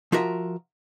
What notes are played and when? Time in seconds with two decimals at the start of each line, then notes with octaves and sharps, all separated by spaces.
0.12 F3 F4 F#4 A#4 E5